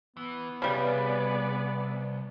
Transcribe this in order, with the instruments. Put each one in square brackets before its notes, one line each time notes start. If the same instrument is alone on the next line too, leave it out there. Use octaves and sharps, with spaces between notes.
[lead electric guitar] E3 [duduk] B3
[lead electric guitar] C2 [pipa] C#3 G3 [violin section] G#4 B4 D5